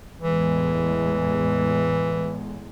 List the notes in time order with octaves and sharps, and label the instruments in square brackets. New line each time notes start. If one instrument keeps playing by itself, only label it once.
[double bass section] E2 A2 G#3 [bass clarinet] E3